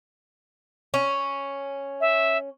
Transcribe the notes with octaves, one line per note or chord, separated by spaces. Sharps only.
C#4
E5